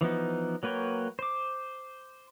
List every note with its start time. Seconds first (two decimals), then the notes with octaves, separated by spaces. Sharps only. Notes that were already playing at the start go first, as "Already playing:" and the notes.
0.01 E3 F3 B3 D#4
0.63 F#3 A#3 B4 C#5 G5
1.19 C5 D6